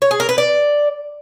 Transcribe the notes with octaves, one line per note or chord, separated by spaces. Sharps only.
C#5
G#4
A#4
B4
D5